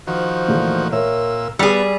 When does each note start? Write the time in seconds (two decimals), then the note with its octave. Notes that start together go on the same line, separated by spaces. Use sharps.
0.07 D#3 F3 F#4 C5
0.48 A#2 E3 A3
0.92 A#2 A#4 C#5 E5 E6
1.59 G3 B3 G4 G#4 D5 G5 E6